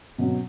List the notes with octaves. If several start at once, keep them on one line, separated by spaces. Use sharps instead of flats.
B2 F#3 C#4